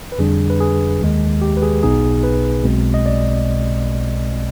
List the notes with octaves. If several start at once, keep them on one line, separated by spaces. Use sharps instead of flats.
B4
F2 D3 G3 D4 G#4
B4
G#4
D#2 D#3 G#3
G4
B4
G#4
B1 B2 B3 D#4 G#4
B4
B1 B2 G#3 C4
D#5
D5